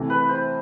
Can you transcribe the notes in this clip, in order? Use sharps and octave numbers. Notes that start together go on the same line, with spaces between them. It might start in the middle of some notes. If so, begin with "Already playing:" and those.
Already playing: C3 E3 A3
B4
C5